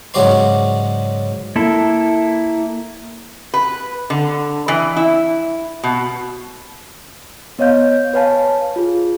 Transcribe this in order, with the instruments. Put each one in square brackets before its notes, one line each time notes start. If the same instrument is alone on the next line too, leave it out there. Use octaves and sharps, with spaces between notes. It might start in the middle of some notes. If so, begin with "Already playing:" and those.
[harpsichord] G#2 C#3 F#3 C#5 D5 C6
[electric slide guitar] A#3 E4 A4
[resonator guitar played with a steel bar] B4
D3
E3
E4
B2
[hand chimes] B3 C#5 D#5 F5 G6
B4 C#5 F5 G#5 A5
F4 G#4